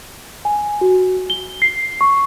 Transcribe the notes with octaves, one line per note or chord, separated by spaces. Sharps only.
G#5
F#4
G7
C7
C#6